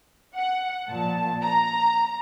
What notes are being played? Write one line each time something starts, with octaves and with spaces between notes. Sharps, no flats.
F#5
A#2 F3 A5
A#5